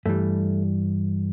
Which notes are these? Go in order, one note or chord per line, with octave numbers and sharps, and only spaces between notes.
G2 E3 G3 A3